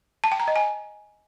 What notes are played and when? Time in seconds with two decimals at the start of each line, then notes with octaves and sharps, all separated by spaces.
0.24 A5
0.32 G5
0.40 A#5
0.48 D#5
0.56 G#5